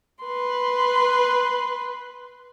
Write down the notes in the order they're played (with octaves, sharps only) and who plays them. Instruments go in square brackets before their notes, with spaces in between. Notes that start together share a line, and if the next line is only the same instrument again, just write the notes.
[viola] B4 C6